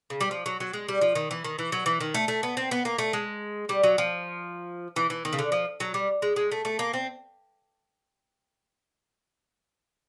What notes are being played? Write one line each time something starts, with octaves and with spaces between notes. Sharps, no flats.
C#3
G3
F3
F#3
F#3
G#3
G3
F3
D#3
E3
D#3
E3
F#3
E3
D#3
A3
A3
B3
C4
B3
A#3
A3
G#3
G3
F#3
F3
E3
E3
D#3
C#3
D3
F3
F#3
G3
G#3
G#3
A3
A3
A#3
C4